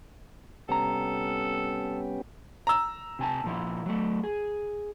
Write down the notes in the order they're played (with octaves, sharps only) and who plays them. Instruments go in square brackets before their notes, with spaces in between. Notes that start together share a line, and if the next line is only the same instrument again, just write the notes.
[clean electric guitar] C2 A#5 [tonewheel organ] B3 C#4 G4 [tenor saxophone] A4
[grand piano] A#5 E6
[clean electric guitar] C3 G#5 A5
A#2 F3 E4
F#3 A3
G#4